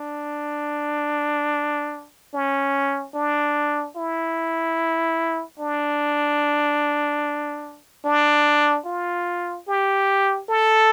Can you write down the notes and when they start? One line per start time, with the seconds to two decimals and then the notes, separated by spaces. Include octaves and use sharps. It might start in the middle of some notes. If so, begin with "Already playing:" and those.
Already playing: D4
2.34 C#4
3.15 D4
3.96 E4
5.59 D4
8.05 D4
8.86 F4
9.68 G4
10.49 A4